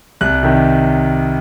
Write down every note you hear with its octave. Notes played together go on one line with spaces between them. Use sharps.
C2 F#6
C3 D#3